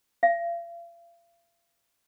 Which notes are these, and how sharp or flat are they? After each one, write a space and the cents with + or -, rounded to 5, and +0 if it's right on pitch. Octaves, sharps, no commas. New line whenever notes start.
F5 -40